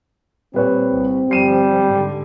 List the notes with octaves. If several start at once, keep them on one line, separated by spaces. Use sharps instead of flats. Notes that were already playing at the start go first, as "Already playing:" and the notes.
A#2 G3 C4 B4 C#5
C2
G1 F3 G3 C7 D#7 E7
G#2 D3